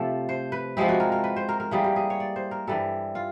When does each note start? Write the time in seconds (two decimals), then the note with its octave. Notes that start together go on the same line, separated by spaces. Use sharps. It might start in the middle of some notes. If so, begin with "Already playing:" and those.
Already playing: C3 F3 A3 A4
0.29 C5
0.52 B4
0.77 F3 G#3 C4 E4 G4
0.89 F#4
1.00 A#4
1.12 A#4
1.24 B4
1.36 C5
1.49 A#4
1.60 A#4
1.71 E3 G3 A#3 G#4
1.84 G4
1.96 G#4
2.10 C#5
2.20 D5
2.36 C5
2.51 A#4
2.67 G2 E3 G3 A4
3.15 F4